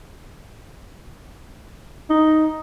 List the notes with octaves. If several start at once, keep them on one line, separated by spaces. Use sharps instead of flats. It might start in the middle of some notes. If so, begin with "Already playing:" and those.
D#4